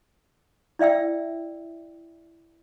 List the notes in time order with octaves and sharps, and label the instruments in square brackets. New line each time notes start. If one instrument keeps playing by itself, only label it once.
[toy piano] E4 D5 E5 G5 E6